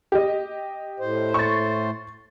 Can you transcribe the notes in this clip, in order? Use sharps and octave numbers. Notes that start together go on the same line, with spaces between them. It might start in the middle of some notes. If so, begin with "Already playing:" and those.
G4 D#5
A2 C5
C#6 A6